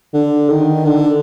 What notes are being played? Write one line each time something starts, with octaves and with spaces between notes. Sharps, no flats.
D3
D#3
D3